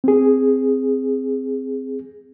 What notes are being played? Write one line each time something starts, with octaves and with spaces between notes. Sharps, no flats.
C4 G#4